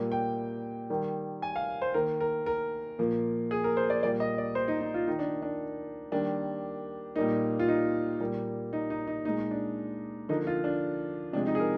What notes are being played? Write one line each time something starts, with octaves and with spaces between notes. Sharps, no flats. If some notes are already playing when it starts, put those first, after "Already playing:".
Already playing: A#2 G3 A#3
G5
D#3 G3 A#3
G#5
F5
C5
D#3 A#3 A#4
A#4
A#4
A#2 F3 A#3
G#4
A#4
C5
D5
A#2 G3 A#3 D5
D#5
D5
C5
D#4
D#4
F4
D#3 A#3 D#4
D4
D4
D#3 G3 A#3 D4
A#2 G3 A#3 D#4
F4
D#4
A#2 G3 A#3
D#4
D#4
D#4
A#2 G#3 D#4
D4
D3 F3 A#3 D#4
F4
D4
C3 F3 G#3 D4
D#4
G#4
A#4